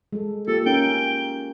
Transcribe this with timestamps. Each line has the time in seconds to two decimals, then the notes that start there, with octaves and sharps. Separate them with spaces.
0.13 G#3 A4
0.48 A#3 F4 G4 A4
0.66 C#4 D#4 A#4 G5